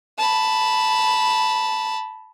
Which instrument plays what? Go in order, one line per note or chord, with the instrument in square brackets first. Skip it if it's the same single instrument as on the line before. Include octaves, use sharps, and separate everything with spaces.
[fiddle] A5 B5